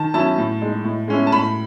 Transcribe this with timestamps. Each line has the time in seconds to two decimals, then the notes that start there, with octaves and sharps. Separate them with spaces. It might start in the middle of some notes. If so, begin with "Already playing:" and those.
Already playing: D#3 A5
0.14 F#3 C#4 E4 A5
0.38 A2
0.62 G#3 D#4
0.84 A2
1.08 G#3 C#4 E4
1.27 A5
1.32 A2 B5